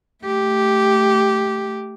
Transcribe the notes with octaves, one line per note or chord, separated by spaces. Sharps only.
A3 G4